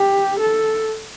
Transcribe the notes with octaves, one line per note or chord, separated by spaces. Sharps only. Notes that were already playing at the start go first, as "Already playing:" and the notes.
Already playing: G4
A4